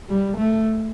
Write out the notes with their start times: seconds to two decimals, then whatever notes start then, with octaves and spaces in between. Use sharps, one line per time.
0.09 G3
0.38 A3